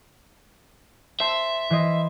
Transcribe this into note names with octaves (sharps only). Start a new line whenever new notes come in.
C5 E5 A5
E3 C5 D#5